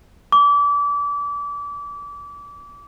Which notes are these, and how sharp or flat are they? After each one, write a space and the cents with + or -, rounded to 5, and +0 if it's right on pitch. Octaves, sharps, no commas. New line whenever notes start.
D6 -30